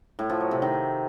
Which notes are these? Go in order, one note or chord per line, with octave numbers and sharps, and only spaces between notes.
A2
F3
F#3
C3
D#3